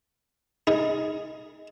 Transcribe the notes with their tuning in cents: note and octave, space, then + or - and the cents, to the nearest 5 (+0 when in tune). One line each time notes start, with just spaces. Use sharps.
D#4 +15 G#4 -5